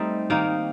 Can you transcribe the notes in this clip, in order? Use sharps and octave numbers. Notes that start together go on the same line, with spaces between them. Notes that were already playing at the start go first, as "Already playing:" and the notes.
Already playing: G3 A3 C4 D#4
D#3 A#3 D#4